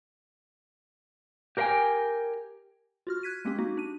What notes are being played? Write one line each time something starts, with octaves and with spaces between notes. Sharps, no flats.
G4 A#4 C5 F5 G5 G#5
F4 F#4 F6
F#6 G#6 B6 D#7
G#3 A#3 C4 C#4 G4
A#3 D#4 F#4
D4 D#7